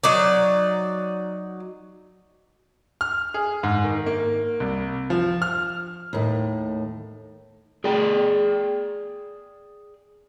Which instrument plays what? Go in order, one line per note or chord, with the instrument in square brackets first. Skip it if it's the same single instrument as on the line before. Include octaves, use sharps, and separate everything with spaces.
[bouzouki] F#3 D#4 D5
[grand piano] F6
G#4
G#2
D#3
A#3
C2
F3
F6
[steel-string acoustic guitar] D#2 A2
[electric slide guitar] G#4 D5 G5